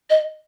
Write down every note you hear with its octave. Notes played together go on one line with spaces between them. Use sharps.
D#5